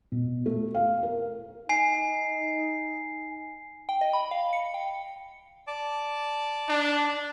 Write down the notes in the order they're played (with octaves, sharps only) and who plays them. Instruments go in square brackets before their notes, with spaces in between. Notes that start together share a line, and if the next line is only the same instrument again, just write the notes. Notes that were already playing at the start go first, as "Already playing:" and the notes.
[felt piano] B2
A3
F5
A#4
[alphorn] D#4 [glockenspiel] G#5 C7
[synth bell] G5
D#5
B5
F5
C#7
G5
[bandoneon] D5 A5 D6
[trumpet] D4